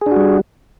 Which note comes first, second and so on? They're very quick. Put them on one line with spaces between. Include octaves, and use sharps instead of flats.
G#4 D4 F#4 G3